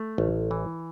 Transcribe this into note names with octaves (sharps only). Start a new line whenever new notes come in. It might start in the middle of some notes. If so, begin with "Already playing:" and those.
Already playing: A3
A1
E3